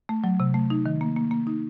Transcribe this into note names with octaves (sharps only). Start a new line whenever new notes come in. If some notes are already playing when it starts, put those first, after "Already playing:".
A3
F#3
C3
A3
D#4
D#3
A#3
A#3
A#3
D#4